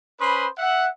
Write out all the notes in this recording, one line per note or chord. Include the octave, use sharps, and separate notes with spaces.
C#4 B4 C5 B5 C6 D#6
E5 F#5